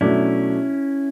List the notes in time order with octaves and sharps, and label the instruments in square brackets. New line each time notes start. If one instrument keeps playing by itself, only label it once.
[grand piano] B2 F#3 A3 D4 [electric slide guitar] C#4 E4